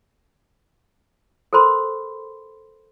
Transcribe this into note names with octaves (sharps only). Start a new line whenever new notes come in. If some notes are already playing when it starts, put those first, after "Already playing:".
A4 A#4 C5 B5 C6